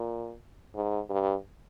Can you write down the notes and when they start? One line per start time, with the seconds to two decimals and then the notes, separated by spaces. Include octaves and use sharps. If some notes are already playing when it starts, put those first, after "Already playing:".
Already playing: A#2
0.75 G#2
1.10 G2